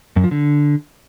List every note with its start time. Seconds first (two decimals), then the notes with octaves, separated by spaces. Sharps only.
0.16 F#2
0.24 F3
0.31 D3